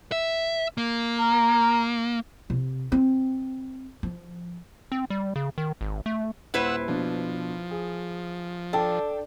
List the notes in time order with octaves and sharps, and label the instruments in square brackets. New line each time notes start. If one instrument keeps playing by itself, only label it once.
[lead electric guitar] E5
A#3
[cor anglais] A#4
[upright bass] C3
C4
F3
[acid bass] C4
G3
C#3
D#3
G#1
A3
[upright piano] D#1 [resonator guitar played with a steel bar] E4 B4 C5 [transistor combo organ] F#5 E6
[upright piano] B2 D4 [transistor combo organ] F3
[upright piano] G#4
[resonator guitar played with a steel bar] D4 [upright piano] A4 G5 A5